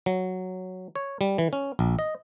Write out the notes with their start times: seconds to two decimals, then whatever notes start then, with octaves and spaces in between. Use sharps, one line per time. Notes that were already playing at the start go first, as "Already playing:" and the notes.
0.06 F#3
0.95 C#5
1.21 G3
1.38 E3
1.53 C#4
1.79 A#1
1.99 D#5